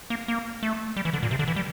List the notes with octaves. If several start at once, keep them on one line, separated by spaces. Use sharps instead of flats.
A#3
A#3
A3
G3
E3
D3
A#2
C3
D3
E3
G3